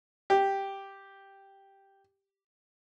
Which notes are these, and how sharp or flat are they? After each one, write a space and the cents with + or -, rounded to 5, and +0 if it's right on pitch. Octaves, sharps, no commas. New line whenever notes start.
G4 +0